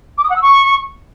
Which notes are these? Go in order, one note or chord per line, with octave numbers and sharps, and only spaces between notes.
D6
D#6
F#5
E6
C#6